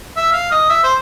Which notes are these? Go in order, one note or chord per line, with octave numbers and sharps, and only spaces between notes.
E5
F5
D#5
E5
C5